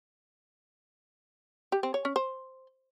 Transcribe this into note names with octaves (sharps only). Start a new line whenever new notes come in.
G4
C4
C#5
C#4
C5